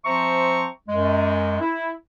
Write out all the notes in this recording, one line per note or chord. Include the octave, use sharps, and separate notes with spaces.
F3 C4 C5 E5 A#5 C#6
F#2 G#3
E4